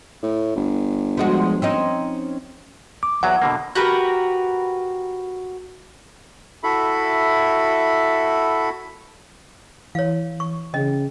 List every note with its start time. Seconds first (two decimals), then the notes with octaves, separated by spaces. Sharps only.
0.23 A2
0.56 G1
1.17 F3 G#3 F#4
1.62 C4 C#4 D#4
3.03 D6
3.23 E2 F#3 F#5
3.42 B2 D3 A#3
3.75 F#4 G4 A#4 B4
6.63 E4 F#4 A4 E5 B5
9.95 E3 C#5 F5
10.40 C#6
10.74 C#3 C#4 D#5